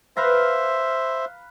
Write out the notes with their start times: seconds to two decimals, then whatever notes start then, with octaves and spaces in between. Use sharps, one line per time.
0.17 B4 C5 E5 F5 A#5